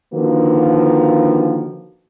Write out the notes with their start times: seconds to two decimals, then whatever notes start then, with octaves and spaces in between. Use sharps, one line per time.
0.14 D3 D#3 F3 A#3 F#4 B4